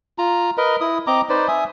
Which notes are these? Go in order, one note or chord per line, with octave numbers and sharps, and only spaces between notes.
F4 A#5
A#4 B4 D#5
E4 D#6
C4 D#5 A#5 D6
D#4 B4 C5 D5
E5 G#5 D#6